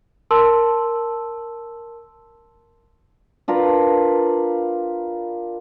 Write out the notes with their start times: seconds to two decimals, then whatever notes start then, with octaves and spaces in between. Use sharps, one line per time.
0.31 A#4 A5 C6 E6
3.48 D4 F4 A#4 B4